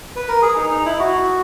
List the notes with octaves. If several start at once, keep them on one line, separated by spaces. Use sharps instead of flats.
B4
A#4
G#4
D#4
D#4
E4
F#4